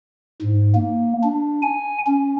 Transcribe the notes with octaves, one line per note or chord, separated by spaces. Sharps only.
G#2
A#3
D4
G#5
C#4